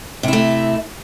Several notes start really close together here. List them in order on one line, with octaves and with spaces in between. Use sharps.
C3 E4 A3